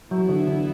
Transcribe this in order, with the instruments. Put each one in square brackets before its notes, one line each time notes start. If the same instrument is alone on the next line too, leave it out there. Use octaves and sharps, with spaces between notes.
[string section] E3 B3 E4 [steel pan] F#3
[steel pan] D3
D3